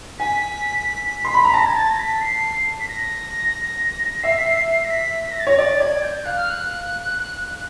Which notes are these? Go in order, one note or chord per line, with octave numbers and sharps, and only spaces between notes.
G#5 B6
C6
B5
A#5
A5 A#6
G#6
A6
A#6
B6
C7
B6
A#6
E5 C7
B6
C7
C7
A#6
B6
B6
A#6
A6
C#5 A#6
D5 A6
D5 G#6
G6
F5 F#6
F6
F#6